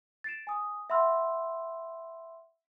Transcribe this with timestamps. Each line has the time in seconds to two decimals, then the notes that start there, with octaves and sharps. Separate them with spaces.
0.24 A6 C7 D7 E7
0.47 G#5 D#6
0.90 E5 F#5 B5 C6 E6 F6